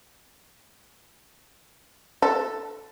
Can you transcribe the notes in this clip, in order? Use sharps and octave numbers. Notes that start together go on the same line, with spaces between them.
A4